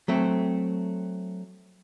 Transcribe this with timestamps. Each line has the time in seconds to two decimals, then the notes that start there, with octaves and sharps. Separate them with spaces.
0.08 F#3 A3 C4